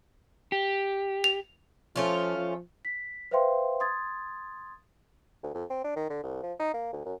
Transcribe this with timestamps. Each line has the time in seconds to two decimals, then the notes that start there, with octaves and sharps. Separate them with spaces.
0.52 G4
1.24 F7
1.96 F3 A3 C#4 F4
2.37 F3
2.85 B6
3.31 B4 C5 E5 F5 G5 C6
3.80 C6 D#6 G#6 A6
5.43 D2
5.55 F2
5.70 C4
5.84 D4
5.96 D#3
6.10 D3
6.23 C2
6.43 F3
6.59 D#4
6.73 A#3
6.93 D2
7.05 F#2